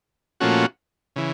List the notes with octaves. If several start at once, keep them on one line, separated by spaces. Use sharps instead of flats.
A#2 F3 A3 C#4 F#4
C#3 E3